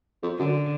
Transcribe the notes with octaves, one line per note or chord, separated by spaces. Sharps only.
F2
F#2 D3